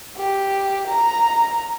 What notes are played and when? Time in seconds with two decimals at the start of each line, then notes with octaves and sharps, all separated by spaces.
0.17 G4
0.88 A#5